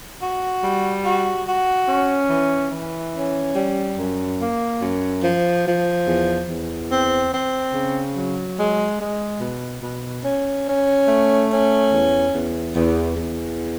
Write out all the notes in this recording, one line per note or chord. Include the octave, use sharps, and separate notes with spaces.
F#4
G3
F#4
F#4
C#4
E3
E3
C#4
G3
F#2
A#3
F#2
F3
F3
E2
E2
C4
C4
C#3
F#3
G#3
G#3
B2
B2
C#4
C#4
A3
C#4
E2
E2
E2
E2